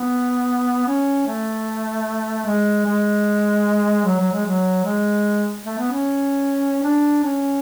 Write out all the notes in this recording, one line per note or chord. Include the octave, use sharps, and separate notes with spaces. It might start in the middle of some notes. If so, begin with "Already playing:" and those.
Already playing: B3
C#4
A3
G#3
G#3
F#3
F#3
G#3
F#3
G#3
A3
B3
C#4
D4
C#4